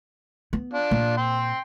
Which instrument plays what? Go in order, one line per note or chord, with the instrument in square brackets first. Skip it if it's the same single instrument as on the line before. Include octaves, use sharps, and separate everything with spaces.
[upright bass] B3
[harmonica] D4 F4
[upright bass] A#2
[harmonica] G5 C6